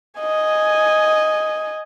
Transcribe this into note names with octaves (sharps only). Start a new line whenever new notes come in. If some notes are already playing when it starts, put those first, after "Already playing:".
D#5 G#5